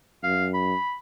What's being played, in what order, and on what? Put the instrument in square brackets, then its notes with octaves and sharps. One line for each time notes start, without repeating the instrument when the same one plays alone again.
[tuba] F#2 [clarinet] F5
[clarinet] B5